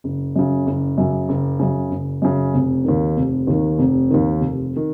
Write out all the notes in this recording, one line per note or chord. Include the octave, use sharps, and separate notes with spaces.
F#1
F#2 C#3
F#1
F#2 C#3
F#1
F#2 C#3
F#1
F#2 C#3
F1
D#2 D#3
F1
D#2 D#3
F1
D#2 D#3
F1
D#3